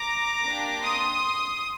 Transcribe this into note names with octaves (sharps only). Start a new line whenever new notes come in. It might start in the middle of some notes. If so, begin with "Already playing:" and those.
Already playing: A#5 D6
A#3 D4 G4
C6 D#6